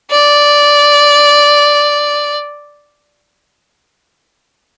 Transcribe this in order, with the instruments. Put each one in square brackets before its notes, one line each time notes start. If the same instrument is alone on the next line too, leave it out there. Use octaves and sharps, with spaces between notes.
[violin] D5